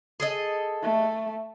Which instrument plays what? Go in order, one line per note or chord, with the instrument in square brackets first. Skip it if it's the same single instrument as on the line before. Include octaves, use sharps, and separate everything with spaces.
[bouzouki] G#4 A4 D#5
[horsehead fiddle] A3